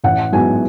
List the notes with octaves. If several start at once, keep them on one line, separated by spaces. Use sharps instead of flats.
A1 F#5
G#2 F#3 B3 E4 G#5